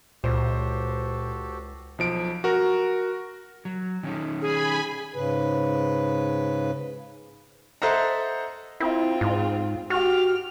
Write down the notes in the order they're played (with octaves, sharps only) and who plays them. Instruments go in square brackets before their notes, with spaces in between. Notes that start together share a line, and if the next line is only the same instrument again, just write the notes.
[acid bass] C#2 [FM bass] A#2 [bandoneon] F#4 G4 A4 [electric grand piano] C5
[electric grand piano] B1 F3 D7
F#4 A#4
[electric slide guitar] F#3
D#3 C#4 D#4
[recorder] G#4 [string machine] G#5 B5
[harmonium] G#2 C#3 B4
[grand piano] A4 C5 D#5 E5 F#5 A#5
[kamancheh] C4 F4 [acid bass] E4
[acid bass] G#2
[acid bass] F#4 [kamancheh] G4 F6